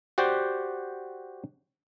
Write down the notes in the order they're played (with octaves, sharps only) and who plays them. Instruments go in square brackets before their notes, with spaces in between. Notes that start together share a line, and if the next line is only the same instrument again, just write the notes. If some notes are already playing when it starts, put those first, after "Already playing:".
[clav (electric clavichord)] F#4 G4 C5 D5 F#5 G5